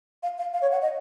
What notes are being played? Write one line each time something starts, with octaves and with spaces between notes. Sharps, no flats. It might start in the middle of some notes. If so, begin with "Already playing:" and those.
F5
F5
F5
C#5
F#5
D#5